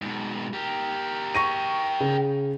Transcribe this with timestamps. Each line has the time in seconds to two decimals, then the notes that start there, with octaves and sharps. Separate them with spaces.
0.02 G#2 B2
0.53 G4 A#4
1.35 C#6 A#6 D#7
2.00 C#3